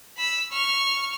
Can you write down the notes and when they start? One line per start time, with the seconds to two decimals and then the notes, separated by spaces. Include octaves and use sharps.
0.17 B5 E6
0.52 C#6 F6